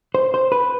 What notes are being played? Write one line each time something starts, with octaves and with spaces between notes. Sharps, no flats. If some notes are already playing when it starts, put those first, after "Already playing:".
C5
C5
B4